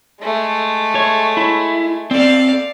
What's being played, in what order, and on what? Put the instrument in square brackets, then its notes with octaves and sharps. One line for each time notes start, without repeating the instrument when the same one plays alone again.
[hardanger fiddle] G#3 A3
[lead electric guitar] C#5
E4
[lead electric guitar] C4 A4 [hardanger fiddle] D5 F5